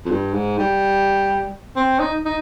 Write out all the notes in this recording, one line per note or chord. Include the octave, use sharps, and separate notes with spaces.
F2
G2
G#2
G3
C4
D#4
D#4